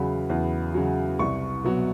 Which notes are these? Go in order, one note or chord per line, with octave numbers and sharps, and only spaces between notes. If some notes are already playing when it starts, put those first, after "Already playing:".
Already playing: E2 C#3 F#3 B5
E2
C#3 F#3
C2 C#6
B2 F#3